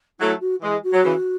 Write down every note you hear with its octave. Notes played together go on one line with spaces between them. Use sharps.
F#3 A3 E4
F#4
E3 G#3 G#4
F#4
F#3
C#3 E3